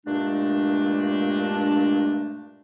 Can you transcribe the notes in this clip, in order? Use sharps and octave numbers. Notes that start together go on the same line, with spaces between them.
G2 A#2 G#3 A3 D4